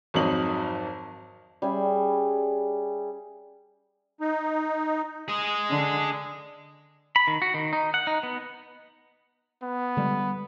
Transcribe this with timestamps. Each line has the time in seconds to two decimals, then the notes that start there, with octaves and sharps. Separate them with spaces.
0.14 G#1 F2 F#3 D#4 F#7
1.62 G3 C#4 G#4 E5
4.21 D#4
5.28 G#4 D#5
5.70 D3
7.16 B5
7.27 D#3
7.42 F#4
7.54 D#3
7.73 D#4
7.94 F#5
8.07 D#4
8.23 B3
9.62 B3
9.97 D3 G3 G#3